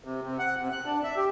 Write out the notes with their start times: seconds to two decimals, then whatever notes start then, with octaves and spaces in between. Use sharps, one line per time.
0.04 C3
0.23 C3
0.39 F#5
0.60 C3
0.72 F#6
0.86 D4
1.04 E5
1.17 G4